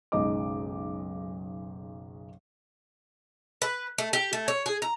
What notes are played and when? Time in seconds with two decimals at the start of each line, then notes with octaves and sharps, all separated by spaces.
0.12 F#1 B1 G#3 D#4 D#5 D6
3.62 B4
3.98 A3
4.13 G4
4.33 A3
4.48 C#5
4.66 G#4
4.82 A#5